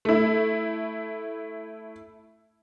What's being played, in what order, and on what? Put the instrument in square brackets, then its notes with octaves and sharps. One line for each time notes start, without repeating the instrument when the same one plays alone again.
[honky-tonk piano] A3 E4